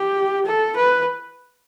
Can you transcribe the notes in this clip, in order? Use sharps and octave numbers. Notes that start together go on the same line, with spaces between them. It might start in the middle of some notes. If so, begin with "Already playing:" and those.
Already playing: G4
A4
B4